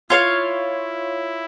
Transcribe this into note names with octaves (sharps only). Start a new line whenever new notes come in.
E4 F4 C#5 F5